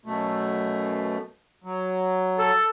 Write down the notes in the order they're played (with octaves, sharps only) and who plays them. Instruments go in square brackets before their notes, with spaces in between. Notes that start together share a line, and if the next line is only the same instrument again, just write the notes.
[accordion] F#2 B2 A3
F#3
[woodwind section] A4